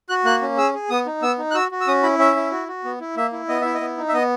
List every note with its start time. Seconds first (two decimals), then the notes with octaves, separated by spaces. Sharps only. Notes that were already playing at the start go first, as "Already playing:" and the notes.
0.09 F#4 F#6
0.25 A#3 F#6
0.42 C#4
0.57 G#4 E6
0.74 G#4
0.90 B3 D#6
1.06 D#4
1.22 B3 E6
1.39 D#4
1.51 F#6
1.55 F#4 E6
1.72 F#4
1.81 E6
1.87 C#4 D#6
2.03 E4 B5
2.19 C#4 E5
2.36 E4
2.52 F#4
2.68 F#4
2.84 B3
3.01 E4
3.16 A#3 E5
3.33 E4
3.48 B3 D#5
3.61 E4 E5
3.74 D#5
3.81 B3
3.97 D#4
4.08 E5
4.13 B3 D#5